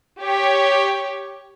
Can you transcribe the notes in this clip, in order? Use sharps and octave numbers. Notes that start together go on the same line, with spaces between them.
G4 C#5